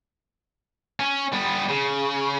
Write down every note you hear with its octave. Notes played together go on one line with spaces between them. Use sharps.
C#4
G3 B3
C#3